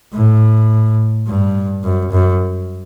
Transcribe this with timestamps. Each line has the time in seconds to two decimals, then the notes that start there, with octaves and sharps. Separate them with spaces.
0.14 A2
1.27 G2
1.84 F#2
2.12 F#2